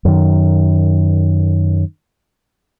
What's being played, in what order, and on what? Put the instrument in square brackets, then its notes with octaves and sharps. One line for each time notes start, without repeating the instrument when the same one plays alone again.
[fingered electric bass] F#2 D#3